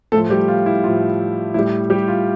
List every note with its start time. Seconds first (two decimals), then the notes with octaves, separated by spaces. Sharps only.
0.12 A2 F3 A3 A4
0.30 G3 G4
0.48 F4
0.66 E4
0.84 A2 F3 F4
1.54 A2 G3 E4
1.90 G3 G4
2.08 F4